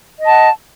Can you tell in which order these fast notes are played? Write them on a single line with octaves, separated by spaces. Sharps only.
D#5 A5 F#5